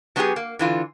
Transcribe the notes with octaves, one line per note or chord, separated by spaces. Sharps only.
F#3 B3 C#4 E4 G4 G#4
A#3
D3 E3 F4